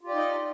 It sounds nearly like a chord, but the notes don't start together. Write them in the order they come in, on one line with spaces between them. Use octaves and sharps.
F4 G4 D5 D#4 D#5